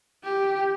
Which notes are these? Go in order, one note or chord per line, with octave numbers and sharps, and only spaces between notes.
G4